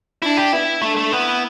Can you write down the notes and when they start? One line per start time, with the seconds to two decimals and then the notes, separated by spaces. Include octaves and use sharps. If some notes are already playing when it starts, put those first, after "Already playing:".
0.22 D4 E4
0.37 G4
0.52 B3 E4
0.82 A3 D4
0.97 A3
1.12 B3 E4